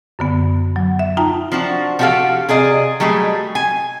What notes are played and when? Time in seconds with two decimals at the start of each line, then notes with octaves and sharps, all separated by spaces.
0.19 F#2 D3 B3
0.76 F#3
0.99 E5
1.17 D#4 F4 G5 A5 A#5
1.52 F3 D4 F#4
1.99 F3 D#4 F#4 G4 A4 F5
2.49 C3 G#4 D5 D#5
3.00 F#3 G3 A3 G#4 D#5
3.55 G#5